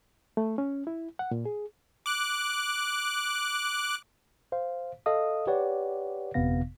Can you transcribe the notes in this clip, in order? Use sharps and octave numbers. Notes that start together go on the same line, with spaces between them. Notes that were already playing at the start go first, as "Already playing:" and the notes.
A3
C#4
E4
F#5
A#2
G#4
D6 F#6
C5 F5
A4 D#5 F5 D#6
G4 B4 C#5 D5 F#5
G1 F2 C3 B3 F5 A#6